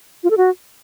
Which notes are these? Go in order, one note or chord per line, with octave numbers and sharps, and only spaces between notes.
F4
A4
F#4